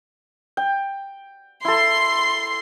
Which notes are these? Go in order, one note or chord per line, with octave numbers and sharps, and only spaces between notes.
G5
E4 A4 C6